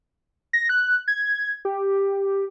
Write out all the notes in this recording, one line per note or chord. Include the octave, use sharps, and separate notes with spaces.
A#6
F#6
G#6
G4